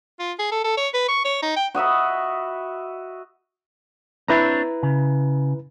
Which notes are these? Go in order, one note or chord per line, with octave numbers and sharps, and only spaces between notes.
F4
G#4
A4
A4
C#5
B4
C#6
C#5
D#4
G5
F#4 D#5 E5 B5
C4 D4 E4 B4 C#5 A#5
C#3